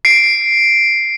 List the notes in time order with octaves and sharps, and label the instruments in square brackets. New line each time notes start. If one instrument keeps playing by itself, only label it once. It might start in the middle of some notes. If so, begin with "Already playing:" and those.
[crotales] C7 D7